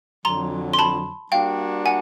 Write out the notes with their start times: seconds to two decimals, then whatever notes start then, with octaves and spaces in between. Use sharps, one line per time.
0.25 F2 D3 F#3 A#5 C6
0.73 C6
0.79 A5 B5
1.32 G3 A#3 D4 F#4 F5 G5
1.86 F#5 G#5